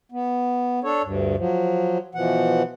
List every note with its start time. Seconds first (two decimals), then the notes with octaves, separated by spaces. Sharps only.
0.12 B3
0.84 D4 A4 C#5
1.03 D2 G2
1.37 F3 F#3
2.15 B2 E3 F3 F#5